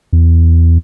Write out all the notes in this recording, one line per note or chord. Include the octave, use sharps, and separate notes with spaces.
E2